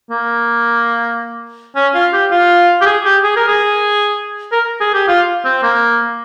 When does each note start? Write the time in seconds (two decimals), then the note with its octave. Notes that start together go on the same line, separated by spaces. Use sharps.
0.10 A#3
1.76 C#4
1.95 F4
2.13 G4
2.31 F4
2.82 G4
2.86 G#4
3.05 G4
3.23 G#4
3.36 A#4
3.48 G#4
4.52 A#4
4.81 G#4
4.94 G4
5.08 F4
5.45 C4
5.63 A#3